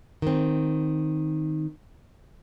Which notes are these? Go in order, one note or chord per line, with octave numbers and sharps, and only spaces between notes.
D#3 C4